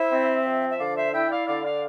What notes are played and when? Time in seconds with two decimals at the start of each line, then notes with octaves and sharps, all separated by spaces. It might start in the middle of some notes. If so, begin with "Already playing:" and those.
Already playing: E4 C5 E5
0.11 C4
0.45 F3
0.70 E5
0.79 D3 D5 F5
0.96 C5 E5
1.13 E4 E5 G5
1.30 D5 F5
1.47 D3 D5 F5
1.64 D5 F5